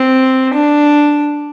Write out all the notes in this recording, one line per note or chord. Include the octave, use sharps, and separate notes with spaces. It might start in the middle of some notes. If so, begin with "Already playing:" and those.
Already playing: C4
D4